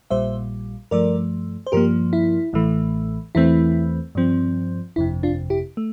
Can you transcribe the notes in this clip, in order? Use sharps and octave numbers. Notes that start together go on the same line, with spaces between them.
A#1 A#2 G3 C5 E5
G2 F3 A3 A#4 D5
C5
G2 F3 A#3 G4 A#4
E4
A1 A2 E3 A3
E2 E3 A3 C4 E4
G2 F3 C4
G1 F2 C3 E4
D4 F4
E4 G4
A3